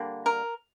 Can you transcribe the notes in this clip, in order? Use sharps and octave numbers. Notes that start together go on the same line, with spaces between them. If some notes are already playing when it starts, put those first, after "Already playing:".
Already playing: D3 G3 A#3
A#4